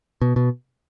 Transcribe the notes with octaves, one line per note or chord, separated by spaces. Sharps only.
B2
B2